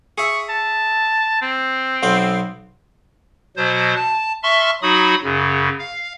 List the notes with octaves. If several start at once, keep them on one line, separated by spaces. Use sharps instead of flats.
G#4 E5 C#6
A5
C4
B1 B3 C5
B2 F#3 C5
A5
E5 A5 C6 C#6 F6
F#3 D#4 F#4 B5 D#6
F#2 C#3
F5